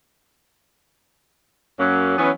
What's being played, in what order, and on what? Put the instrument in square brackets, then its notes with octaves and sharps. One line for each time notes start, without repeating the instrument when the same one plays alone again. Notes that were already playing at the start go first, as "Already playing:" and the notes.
[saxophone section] F#2 F#3 A#3 C#4
E3 F#3 B3 C#4